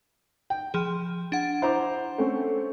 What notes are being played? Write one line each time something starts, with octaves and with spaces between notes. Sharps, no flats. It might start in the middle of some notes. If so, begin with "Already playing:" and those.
G5
F3 G#4
D4 F#5
E4 C5 A#5 D6
A3 C4 C#4